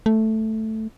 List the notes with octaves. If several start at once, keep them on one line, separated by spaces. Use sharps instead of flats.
A3